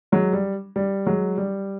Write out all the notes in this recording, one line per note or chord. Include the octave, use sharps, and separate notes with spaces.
F#3 G#3
G3
G3
F#3 G#3
G3